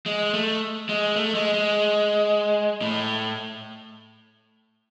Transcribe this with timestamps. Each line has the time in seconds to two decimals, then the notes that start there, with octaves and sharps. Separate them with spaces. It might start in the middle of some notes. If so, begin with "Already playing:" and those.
0.06 G#3
0.34 A3
0.89 G#3
1.16 A3
1.35 G#3
1.54 G#3
2.81 A2